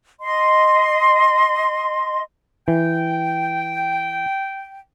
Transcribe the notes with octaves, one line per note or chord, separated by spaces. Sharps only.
D#5 C6
E3 G5